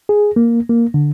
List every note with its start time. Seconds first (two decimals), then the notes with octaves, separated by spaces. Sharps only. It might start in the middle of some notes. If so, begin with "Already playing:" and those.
0.09 G#4
0.36 A#3
0.70 A#3
0.94 D3